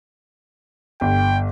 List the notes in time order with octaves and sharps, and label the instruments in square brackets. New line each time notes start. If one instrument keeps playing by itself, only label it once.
[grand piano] G1 [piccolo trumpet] G5